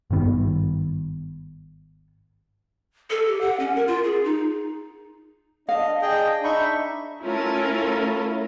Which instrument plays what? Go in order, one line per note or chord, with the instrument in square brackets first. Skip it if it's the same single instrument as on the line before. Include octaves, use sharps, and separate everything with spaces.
[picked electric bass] G#1 G2 D#3 B3
[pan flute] A4
G4
F#5
C#4
A#4
F4
G#4
D#4
[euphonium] D4 [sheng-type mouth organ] D#5 [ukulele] F5
[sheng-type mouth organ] G#4 D#5 G5
[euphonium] D4 [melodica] D#4 B5 [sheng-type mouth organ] E5 C#6
[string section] A3 C#4 E4 F4 A4 A#4